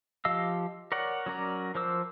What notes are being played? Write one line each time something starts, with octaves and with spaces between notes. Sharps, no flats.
F3 G4 D#5 F5 E6
A#4 C#5 D5 F#5
F#3 C#4 A#4 D5
F3 A#4 C5 D6 E6